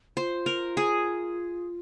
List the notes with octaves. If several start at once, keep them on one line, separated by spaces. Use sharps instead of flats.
F4 C5
A#4
G#4